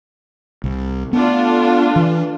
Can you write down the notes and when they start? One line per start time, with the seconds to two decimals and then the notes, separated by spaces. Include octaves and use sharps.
0.64 C2
1.13 A3 B3 D4 F4
1.96 E3